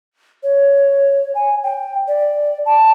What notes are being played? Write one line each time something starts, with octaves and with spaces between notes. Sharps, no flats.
C#5
G#5
G5
D5
A5